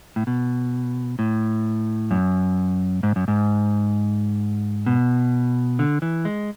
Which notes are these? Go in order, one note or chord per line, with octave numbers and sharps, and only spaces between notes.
A2
B2
A2
F#2
G#2
F#2
G#2
B2
D3
E3
G#3